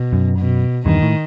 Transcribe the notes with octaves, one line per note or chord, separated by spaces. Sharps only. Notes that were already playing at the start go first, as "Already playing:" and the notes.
Already playing: B2
F#2
B2
E2 G2 D#3
A2